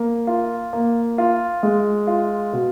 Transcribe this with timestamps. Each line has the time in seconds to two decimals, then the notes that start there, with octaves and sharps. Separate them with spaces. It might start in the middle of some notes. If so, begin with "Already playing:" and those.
Already playing: A#3
0.27 F4
0.73 A#3
1.18 F4
1.63 G#3
2.07 F4
2.53 B2